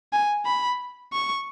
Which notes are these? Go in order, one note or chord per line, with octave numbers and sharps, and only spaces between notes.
G#5
B5
C#6